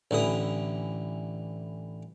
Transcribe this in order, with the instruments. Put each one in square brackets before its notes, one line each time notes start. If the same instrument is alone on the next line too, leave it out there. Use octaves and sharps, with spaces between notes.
[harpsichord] A1 D3 E3 D#6